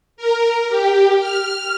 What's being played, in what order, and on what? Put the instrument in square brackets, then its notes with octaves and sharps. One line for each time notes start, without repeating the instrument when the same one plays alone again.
[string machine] A#4
G4
F6